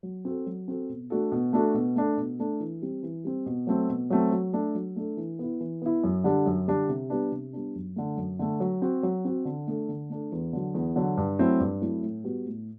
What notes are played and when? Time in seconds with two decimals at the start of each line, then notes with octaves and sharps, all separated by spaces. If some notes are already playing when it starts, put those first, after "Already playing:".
0.03 F#3
0.25 C4 F#4 A4
0.46 F#3
0.68 C4 F#4 A4
0.89 B2
1.10 A3 D4 F#4 A4
1.32 B2
1.53 A3 D4 F#4 A4
1.74 B2
1.96 A3 D4 A4
2.17 B2
2.39 A3 D4 A4
2.60 E3
2.82 G3 C4
3.03 E3
3.24 G3 C4
3.46 B2
3.67 F#3 A3 C4
3.89 B2
4.10 F#3 A3 C4
4.31 F#3
4.53 A3 D4 A4
4.75 F#3
4.96 A3 D4 A4
5.17 E3
5.39 B3 E4
5.61 E3
5.82 B3 E4
6.04 F#2
6.24 D3 G3 D4
6.46 F#2
6.68 D3 G3 D4
6.89 C3
7.10 G3 B3 D4
7.32 C3
7.53 G3 B3 D4
7.75 F#2
7.96 D3 A3
8.17 F#2
8.39 D3 A3
8.60 F#3
8.82 C4 F#4
9.03 F#3
9.25 C4 F#4
9.45 D3
9.67 A3 D4 A4
9.89 D3
10.10 A3 D4 A4
10.32 E2
10.53 D3 F#3
10.75 E2
10.96 D3 F#3
11.17 G2
11.39 F#3 A3 C4 E4
11.60 G2
11.81 F#3 A3 C4 E4
12.03 A2
12.24 G3 B3 F#4
12.46 A2